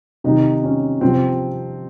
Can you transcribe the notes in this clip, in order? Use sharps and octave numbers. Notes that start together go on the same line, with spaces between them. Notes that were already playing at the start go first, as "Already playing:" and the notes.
C3 D#3 D#4
C#4
C3 F3 C4